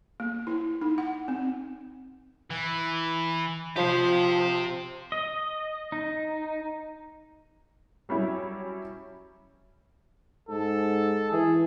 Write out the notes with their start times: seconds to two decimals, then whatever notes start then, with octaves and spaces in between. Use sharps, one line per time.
0.20 A#3
0.47 E4
0.81 D#4
0.98 F#5
1.28 C4
2.50 E3
3.76 F3 G4 C5
5.12 D#5
5.92 D#4
8.09 F#3 G3 C#4 E4
10.49 G#2 A4
11.32 E3 G#4